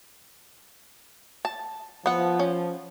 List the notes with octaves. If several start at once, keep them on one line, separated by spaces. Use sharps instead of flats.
A5
F3 B3 F#5
C#4